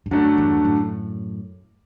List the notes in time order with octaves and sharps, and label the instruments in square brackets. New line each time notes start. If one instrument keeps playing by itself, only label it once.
[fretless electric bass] G2
[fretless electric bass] F#2 [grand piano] D3 F#3 A3 D4
[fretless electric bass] E2 G2
F#2 A2